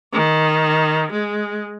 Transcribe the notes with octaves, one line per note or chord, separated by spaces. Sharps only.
D#3
G#3